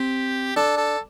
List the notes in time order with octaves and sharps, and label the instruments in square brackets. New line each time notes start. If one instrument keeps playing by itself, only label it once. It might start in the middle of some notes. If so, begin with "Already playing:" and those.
Already playing: [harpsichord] C4 [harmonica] G4
[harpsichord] D4 [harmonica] A4
[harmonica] A4